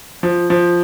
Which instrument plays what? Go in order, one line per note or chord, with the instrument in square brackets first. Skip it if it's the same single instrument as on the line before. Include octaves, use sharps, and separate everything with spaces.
[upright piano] F3
F3